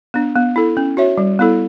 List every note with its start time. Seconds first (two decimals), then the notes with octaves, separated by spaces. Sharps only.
0.14 B3 D4
0.36 B3
0.56 E4 A4
0.77 C#4
0.97 F#4 C#5 E5
1.18 G3
1.39 B3 E4 A4